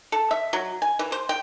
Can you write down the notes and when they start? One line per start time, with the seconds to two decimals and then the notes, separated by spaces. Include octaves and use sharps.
0.12 A4
0.31 E5
0.53 F#3
0.82 G#5
0.99 E3
1.12 C5
1.29 G5